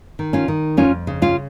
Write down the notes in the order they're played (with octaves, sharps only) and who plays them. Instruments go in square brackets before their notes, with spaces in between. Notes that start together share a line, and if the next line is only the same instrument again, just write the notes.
[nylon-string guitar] D#3
C#4 F4
D#3
F2 C#4 F4
C#3
C#4 F4